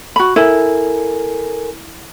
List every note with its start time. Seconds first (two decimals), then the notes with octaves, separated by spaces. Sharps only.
0.16 F#4 B5
0.36 E4 A4 A#4 G#5